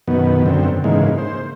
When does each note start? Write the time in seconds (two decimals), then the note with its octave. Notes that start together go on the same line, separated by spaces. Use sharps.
0.08 F#2 B2 D#3 B3
0.46 F#2 D3 C4
0.84 G#2 C#3 E3 G#3 A#3 D#4
1.18 C5